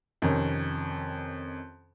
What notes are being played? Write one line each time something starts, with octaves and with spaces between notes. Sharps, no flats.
F2 C3 D#3 C#4